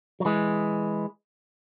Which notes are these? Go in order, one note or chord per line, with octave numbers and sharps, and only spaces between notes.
F#3
E3 G#3